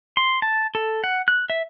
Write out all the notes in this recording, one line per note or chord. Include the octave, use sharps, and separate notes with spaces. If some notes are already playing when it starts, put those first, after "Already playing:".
C6
A5
A4
F#5
F#6
E5